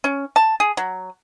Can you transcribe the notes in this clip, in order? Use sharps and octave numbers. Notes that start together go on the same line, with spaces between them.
C#4
A5
G#4
F#3